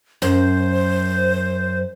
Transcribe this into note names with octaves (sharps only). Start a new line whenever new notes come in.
F#2 C5